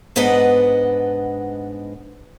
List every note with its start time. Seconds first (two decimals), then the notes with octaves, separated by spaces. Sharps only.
0.16 G#2 B3 D4 B4 D#5 F#5